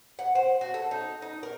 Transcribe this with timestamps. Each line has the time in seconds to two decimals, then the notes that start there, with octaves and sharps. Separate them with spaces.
0.19 F#5
0.35 C5
0.61 F#4
0.74 A4
0.91 D#4
1.22 D#4
1.43 A#4